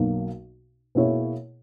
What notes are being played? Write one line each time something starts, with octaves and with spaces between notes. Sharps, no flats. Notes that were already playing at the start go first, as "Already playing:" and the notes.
Already playing: B1 B2 F#3 A#3
B2 A#3 E4 G#4 C#5